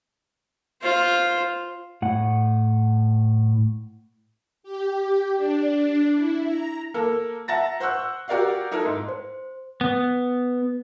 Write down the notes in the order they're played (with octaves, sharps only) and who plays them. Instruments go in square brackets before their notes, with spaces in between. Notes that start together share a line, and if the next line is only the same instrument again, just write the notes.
[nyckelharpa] F4 C5
[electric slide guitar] A2 F#5
[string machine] G4
D4
E4
A#5
[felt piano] A#3 A4 A#4
E5 F#5 A5 A#5 A6 A#6
C5 F#5 C#6 E6 F#6
F#4 G4 A#4 D5 F5 F#5
D#4 E4 A4 A#4
G#2
[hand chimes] C5
[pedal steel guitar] B3